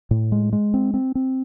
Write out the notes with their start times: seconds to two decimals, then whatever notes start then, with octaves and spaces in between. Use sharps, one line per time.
0.11 A2
0.32 G#3
0.53 G#3
0.74 C4
0.94 C4
1.15 C4